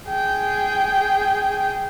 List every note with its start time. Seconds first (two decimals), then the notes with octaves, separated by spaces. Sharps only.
0.10 G#4 G5